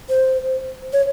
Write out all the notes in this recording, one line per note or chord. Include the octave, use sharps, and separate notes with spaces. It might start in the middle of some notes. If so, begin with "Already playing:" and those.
C5
C#5